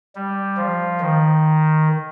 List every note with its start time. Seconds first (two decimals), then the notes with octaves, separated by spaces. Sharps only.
0.15 G3
0.57 F3
1.00 D#3